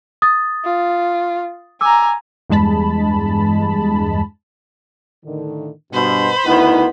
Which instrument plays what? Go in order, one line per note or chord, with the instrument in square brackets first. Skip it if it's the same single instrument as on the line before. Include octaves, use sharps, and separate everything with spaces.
[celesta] D#6 A6
[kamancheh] F4
[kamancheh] G#5 A#5 [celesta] D6 E6
[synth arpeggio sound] E2 G2 G#3 A5 B5
[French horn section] A2 D3 D#3
[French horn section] G2 [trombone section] B2 [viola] C5 B5
[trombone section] D2 D#3 B3 [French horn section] D#4 E4